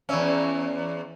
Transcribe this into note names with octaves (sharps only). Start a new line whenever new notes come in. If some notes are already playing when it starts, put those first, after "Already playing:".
E2 C#4 D5 E5 F5